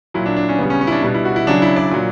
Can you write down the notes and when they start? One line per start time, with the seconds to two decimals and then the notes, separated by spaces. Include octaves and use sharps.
0.14 A#2 F#3 E4
0.26 D4
0.37 D4
0.49 C#4
0.59 C#3 B3
0.63 G3
0.70 C#4
0.81 C#4
0.87 E4
0.92 D4
1.03 B2 G3 D4
1.14 E4
1.25 F#4
1.36 E4
1.47 C#3 F#3 D4
1.62 E4
1.76 D5
1.91 A#2 F#3